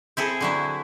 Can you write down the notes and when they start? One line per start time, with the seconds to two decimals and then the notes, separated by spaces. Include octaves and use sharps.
0.17 C4 E4 G#4 A4
0.41 D3 F#3 E4